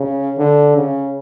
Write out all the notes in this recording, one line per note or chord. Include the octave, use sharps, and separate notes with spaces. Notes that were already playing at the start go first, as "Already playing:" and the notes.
Already playing: C#3
D3
C#3